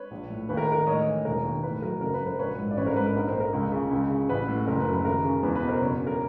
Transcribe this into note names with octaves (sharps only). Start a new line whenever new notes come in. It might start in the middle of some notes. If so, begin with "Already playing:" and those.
Already playing: B4 C#5
A#1
A2
D#2 B4
A#4
D#3 A#4
A2 C#5 D#5
E3
E1 A#4
D#2
A2 B4
F#3 A#4
F#1 A#4
B4
F#2
A#4 C5
A#1 B4 C#5
G#2
D5
A1 B4 C#5
A#4 C5
G#2 B4
A#4
A#1 B4
A#4 C5
A#2
A#4
C#2
C#3
C#2
C#3
A1 B4
A2
F#1 A#4
B4
F#2
B4
D#2 A#4
C#3
E2 B4
B4
B2
A#4 C5
F#1 B4 C#5
F#2
A#4